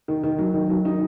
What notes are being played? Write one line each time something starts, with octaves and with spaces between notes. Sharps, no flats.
D#3
D#3
F#3
D#3
F#3
D#4